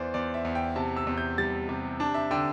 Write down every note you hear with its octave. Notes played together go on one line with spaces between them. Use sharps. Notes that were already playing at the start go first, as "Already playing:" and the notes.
Already playing: E2 E3 C5 D5
E2 D5
E5
E2
G5
C3 A5
E6
E2
G6
G3 A6
C3
D4 A5
E5
D3 G5